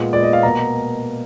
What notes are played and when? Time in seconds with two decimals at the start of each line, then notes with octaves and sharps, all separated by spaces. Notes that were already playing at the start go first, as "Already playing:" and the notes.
Already playing: A#2 G#3 B3
0.13 A#2 G#3 B3 D5
0.23 D#5
0.33 F5
0.43 B2 A#3 A#5